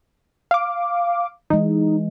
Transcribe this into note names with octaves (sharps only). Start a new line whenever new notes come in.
F5 D6
E3 G#3 D#4